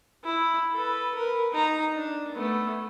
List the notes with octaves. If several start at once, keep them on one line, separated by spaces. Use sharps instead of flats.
E4
A4 B4
A#4 B4
D#4 A#5
D4
A3 B3